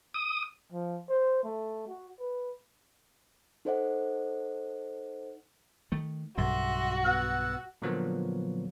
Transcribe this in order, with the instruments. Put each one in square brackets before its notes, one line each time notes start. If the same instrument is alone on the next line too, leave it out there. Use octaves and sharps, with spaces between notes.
[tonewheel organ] D#6
[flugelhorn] F3
C5
A3
F#4
B4
[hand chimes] D#4 A4 C5 D5 D#5 F#5
[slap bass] D#3 A3
[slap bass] B1 G2 C#3 [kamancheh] F#4 [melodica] E5 C6
[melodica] B3 E6 [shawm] F#5
[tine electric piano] A#2 D3 F3 F#3 A#3 B3